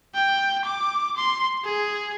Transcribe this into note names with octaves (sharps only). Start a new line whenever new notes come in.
G5
D6
C6
G#4